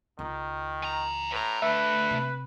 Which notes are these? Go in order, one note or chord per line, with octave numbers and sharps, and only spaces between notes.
C#2 D#3
E3 A#5
A2 B4 A#5
D3 A3 B4 E5
C3